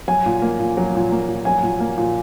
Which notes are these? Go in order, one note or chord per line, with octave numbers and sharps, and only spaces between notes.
F#3 G#5
A#2
A#3
A#2
F#3
A#2
A#3
A#2
F#3 G#5
A#2
A#3
A#2